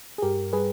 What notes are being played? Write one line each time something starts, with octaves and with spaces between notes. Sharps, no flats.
G#4
G2 G4 A#4
G3 G#4 B4